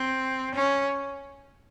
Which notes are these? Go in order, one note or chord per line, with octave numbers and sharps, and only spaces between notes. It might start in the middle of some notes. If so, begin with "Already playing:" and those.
Already playing: C4
C#4